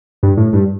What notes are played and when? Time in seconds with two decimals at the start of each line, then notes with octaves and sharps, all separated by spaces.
0.23 G2
0.37 A2
0.53 G2